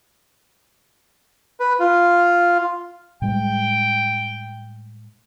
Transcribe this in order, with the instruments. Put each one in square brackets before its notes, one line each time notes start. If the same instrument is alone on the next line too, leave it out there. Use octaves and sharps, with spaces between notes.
[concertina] B4
F4
[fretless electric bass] A2 G3 G#3 [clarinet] G5